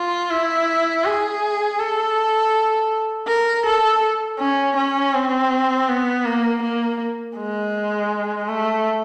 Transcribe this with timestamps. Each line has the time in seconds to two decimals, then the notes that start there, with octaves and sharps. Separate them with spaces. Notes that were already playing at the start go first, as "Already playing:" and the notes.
Already playing: F4
0.30 E4
1.05 G#4
1.79 A4
3.28 A#4
3.66 A4
4.39 C#4
4.77 C#4
5.14 C4
5.89 B3
6.25 A#3
6.63 A#3
7.37 G#3
8.49 A3